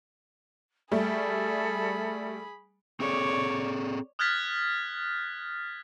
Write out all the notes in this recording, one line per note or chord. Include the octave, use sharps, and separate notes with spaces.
G3 A3 G#4 A4 B5
C4 G#4 A4 C#5 D5
D#6 F6 F#6 G#6 A6 B6